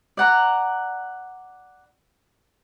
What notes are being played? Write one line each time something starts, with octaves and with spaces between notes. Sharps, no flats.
D5 F#5 A#5